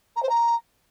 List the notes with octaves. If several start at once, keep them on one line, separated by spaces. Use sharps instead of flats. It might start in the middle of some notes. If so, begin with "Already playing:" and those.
A#5
C5
A#5